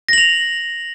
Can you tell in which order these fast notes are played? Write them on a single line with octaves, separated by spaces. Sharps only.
A#6 F#7 F7